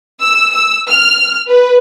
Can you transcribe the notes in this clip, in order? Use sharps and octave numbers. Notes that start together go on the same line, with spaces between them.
E6
E6
F6
B4